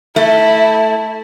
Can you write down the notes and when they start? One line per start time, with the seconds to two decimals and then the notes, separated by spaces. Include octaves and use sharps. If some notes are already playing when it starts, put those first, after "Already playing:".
0.16 A3 E4